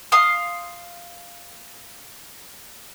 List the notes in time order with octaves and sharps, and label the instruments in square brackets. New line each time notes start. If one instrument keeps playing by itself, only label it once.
[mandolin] F5 C6 D#6